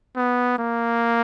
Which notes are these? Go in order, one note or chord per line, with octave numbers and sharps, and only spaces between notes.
B3
A#3